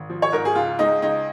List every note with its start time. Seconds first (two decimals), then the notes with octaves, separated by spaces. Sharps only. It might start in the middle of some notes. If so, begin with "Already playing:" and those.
Already playing: G#1
0.10 F3
0.22 C#5
0.32 G#2 A#4
0.45 G#4
0.55 C#2 F4
0.79 G#3 D#4
1.02 C#2 D#4